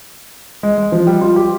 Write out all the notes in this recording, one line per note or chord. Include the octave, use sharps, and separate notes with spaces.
G#3
G#3
F3
G3
F4
G4